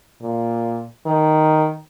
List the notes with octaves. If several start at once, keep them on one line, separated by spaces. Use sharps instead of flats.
A#2
D#3